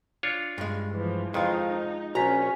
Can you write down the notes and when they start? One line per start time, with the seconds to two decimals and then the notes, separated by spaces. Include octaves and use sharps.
0.23 D4 F4 C#5
0.58 G2 G#3
0.92 E3 F3
1.34 F2 D#3 G#3 D#4 F4
2.15 A#1 C#4 F#4 G#5 A#5 B6